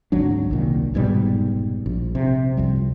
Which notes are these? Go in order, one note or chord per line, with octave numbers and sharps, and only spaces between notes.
G#1 D2 F#3 D4
C2 A#2 D#3
F1 G#2 B2 G3
A#1
C3
C2 F2 G3